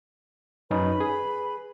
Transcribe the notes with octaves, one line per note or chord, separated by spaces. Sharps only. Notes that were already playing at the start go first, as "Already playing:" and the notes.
F#2 C#4 D#4 B4 B5
G#4